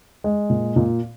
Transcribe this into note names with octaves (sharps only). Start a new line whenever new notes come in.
G#3
A#2
A#2